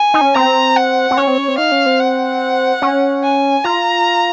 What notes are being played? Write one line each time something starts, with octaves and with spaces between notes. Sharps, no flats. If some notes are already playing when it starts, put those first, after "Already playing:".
Already playing: G#5
D#4
C#4
C4 A#5
F#5
C4
C#4 C#5
C4
C#4
C4
D#4 F5
C#4
C4
F#5
C#4
G#5
F4 A#5